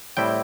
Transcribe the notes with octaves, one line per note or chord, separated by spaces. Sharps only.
A2 G3 C4 E4 G5